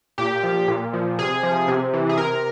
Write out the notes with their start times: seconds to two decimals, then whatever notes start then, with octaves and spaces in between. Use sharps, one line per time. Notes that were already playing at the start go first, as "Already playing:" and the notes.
0.18 A#2 G4
0.43 F3
0.68 A#2
0.93 F3
1.19 C3 G#4
1.43 F3
1.68 C3
1.93 E3
2.09 G#4
2.17 C3 A#4